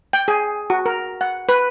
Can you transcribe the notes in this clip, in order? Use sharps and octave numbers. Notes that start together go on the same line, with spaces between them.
G5
G#4
F#4
A#4
F#5
B4